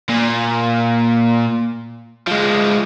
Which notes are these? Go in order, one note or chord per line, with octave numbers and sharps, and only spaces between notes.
A#2
F3 G#3